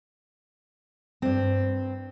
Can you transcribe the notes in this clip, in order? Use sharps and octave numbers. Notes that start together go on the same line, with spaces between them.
G2 C4